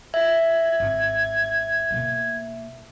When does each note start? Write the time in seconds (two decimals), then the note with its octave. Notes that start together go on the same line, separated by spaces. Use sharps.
0.14 E5 G#6
0.80 G#1
1.91 B2 A#3